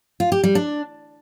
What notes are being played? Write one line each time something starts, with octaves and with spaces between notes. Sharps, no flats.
F4
G4
G3
D4